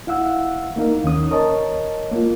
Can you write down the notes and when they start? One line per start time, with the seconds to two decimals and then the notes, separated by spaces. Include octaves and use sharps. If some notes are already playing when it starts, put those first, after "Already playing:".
0.07 E4 F5 F#5 E6
0.76 A#3 D#4 A#4 F5
1.03 D#2 D#3 C#4 D#6
1.31 A#4 C#5 D#5 A5
2.12 A#3 F4